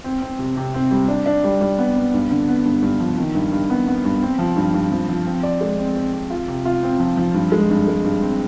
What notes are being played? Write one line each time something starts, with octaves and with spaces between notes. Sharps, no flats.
C4
C4
C3
C3
C4
G3
D4
D4
G3
G3
B3
B3
G2
D3
B3
G2
G2
F3
D#3
G2
G2
B3
B3
G2
C4
F3
G2
G2
F3
F3
C4
D5
G#3
C4
C4
C4
F4
C3
F4
C4
F3
F3
G2
G#3
G2
G#3
G2
C4